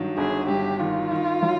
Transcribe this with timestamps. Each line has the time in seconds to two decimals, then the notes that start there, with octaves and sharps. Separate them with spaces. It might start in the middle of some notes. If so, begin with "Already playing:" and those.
Already playing: G2 D#3 F#3
0.17 G1 G#4
0.48 G2 G4
0.80 D#3 F4
1.11 D#3
1.42 F#3